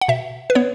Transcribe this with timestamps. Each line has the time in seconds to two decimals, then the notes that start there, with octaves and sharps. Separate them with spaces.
0.01 F#5
0.08 B2 E5
0.50 B4
0.55 B3 C#5